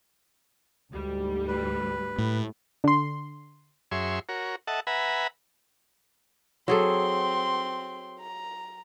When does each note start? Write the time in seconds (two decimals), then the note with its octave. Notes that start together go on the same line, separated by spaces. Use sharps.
0.93 D2 G#2 G3
1.48 B4
2.18 A2
2.84 D3 C6
3.91 F#2 G#4 C#5 E5 C6
4.29 F#4 A#4 C#5
4.67 A4 D#5 E5 F#5 A5
4.87 B4 E5 F#5 G#5 A#5 B5
6.68 F#3 C4 G#4 A4 C6
8.20 A#5